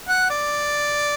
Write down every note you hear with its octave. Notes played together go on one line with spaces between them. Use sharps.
F#5
D5